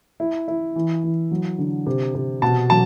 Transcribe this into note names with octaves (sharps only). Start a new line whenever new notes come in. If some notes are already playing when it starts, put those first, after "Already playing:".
E4
E4
E3
E3
F#3
D3
C3
C3
B2 A5
F#3 A5